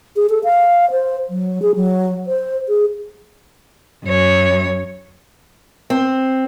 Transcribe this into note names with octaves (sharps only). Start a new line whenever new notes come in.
G#4
A4
F5
C5
F#3
G#4
F#3
C5
G#4
F#2 C#5
C4